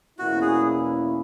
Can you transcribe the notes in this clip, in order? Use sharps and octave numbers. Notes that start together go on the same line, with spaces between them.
E2 B2 A#3 C#4 E4 F#4
G#4